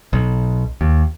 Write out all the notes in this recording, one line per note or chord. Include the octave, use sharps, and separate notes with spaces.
B1
D#2